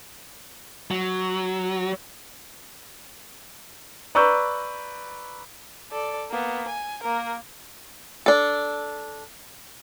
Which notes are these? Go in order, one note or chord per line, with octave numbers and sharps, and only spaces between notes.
F#3
B4 D5 A#5 C#6 E6 G6
A4 D5
A#3 B3
G#5
A#3 A#4
D4 A4